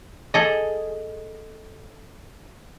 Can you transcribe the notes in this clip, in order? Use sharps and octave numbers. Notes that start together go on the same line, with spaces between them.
G#4 A4 D#5